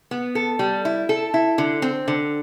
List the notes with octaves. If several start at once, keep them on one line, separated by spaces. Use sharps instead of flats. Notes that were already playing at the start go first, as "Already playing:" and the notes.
B3
A4
G3
E4
A4
E4
D3
C4
D3